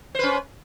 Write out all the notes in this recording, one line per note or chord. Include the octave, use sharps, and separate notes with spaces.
C#4 B4 C5